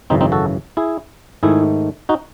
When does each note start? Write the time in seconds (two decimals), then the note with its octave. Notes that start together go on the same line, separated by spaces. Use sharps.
0.10 G#1 F#2 C#3 E3 C4 D#4
0.21 C4 D#4
0.32 F#4 A4
0.77 E4 G#4
1.43 G#2 D#3 A3 E4 G#4
2.09 D#4 F#4